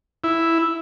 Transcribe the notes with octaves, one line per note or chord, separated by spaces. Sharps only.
E4